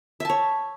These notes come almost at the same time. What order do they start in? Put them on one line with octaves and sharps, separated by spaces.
E5 A5 C#5